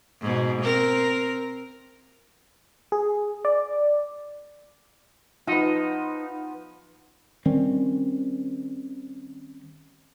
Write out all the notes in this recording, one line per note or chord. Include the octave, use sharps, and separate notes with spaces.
G#2 B2
C4 A#4
G#4
D5
F3 B3 D#4
D#3 G3 C4 C#4